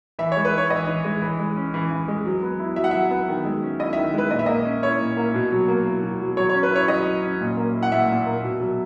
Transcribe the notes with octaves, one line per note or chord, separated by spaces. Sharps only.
E3 E5
C#5
G#3
B4
D#4 C#5
E3 D#5
E3
G#3
E3
G#3
C#4
E3
E3
G#3
F#3
B3
E4
F#3 E5
F#5
F#3 E5
B3
D#3
G#3
C#4
E4 D#5
D#3 E5
G#3 B4
A#2 D#5
E5
A#3 D#5
C#4
E4 C#5
A#2
A#3
B2
F#3
A#3
E4
B2
F#3
F#3 C#5
C#5
C#4
B4
E4 C#5
F#3 D#5
F#3
C#4
A#2
A#3
E4
F#5
A#2 E5
A#2
A#3
B2
F#3